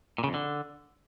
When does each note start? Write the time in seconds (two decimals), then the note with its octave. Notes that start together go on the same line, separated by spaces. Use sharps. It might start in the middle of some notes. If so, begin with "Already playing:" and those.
0.18 A#2
0.24 C#3
0.29 F2
0.34 D3